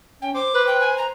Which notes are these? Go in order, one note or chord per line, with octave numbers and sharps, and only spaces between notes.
C#4 G5
C5 D6
B4 C5
G5
G#5
A#5